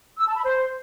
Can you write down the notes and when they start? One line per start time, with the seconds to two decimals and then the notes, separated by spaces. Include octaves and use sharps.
0.18 E6
0.27 A5
0.36 B5
0.44 C5